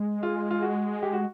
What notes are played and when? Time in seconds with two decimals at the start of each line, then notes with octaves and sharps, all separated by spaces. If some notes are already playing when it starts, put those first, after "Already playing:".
Already playing: G#3
0.23 F4
0.51 F4
0.62 F#4
1.02 G4
1.13 F#4